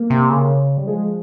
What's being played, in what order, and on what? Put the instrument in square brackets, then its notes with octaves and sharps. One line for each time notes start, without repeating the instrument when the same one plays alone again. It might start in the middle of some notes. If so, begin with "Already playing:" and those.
Already playing: [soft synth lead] A#3
[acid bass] C3
C#3
G3
[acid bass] F3 [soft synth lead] G#3